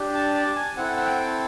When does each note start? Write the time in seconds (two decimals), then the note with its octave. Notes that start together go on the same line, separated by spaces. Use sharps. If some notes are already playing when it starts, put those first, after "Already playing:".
Already playing: D4 G4
0.14 A5
0.34 A5
0.56 G#5
0.77 C4 E4 A4 F#5
0.97 F#5
1.06 G5